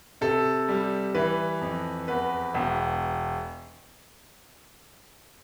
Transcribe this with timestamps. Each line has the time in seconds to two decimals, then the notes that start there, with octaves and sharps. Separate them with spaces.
0.21 C3 A4
0.68 G3
1.15 E3 B4
1.61 F2
2.08 E2 B4
2.54 E1